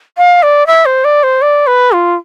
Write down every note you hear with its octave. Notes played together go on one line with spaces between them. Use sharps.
F5
D5
E5
C5
D5
C5
D5
B4
F4